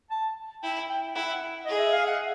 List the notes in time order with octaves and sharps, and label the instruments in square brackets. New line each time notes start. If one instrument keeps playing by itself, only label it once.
[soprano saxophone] A5
[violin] E4 [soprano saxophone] G5
[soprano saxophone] G5
[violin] E4 [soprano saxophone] F#5
[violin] G#4 [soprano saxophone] D#5
[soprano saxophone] E5
F5
F#5